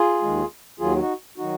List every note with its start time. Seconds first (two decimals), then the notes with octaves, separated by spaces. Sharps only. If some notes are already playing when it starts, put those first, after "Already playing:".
Already playing: F4 G#4
0.22 D#2 D#3 G#3
0.79 D#2 D#3 F#3 F4 G#4
0.99 D#4 F#4
1.37 D#3 F#3 D#4 F#4